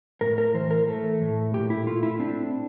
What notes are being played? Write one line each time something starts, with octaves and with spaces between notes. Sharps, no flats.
A2 A#4
A#4
E3 C5
A#4
A3 A4
A2
A#2 G4
E4
A3 F4
E4
C4 D4